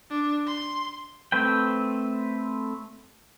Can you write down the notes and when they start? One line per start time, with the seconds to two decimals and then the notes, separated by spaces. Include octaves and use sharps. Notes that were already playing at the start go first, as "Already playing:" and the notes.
0.10 D4
0.47 C6
1.32 A3 C4 B4 G5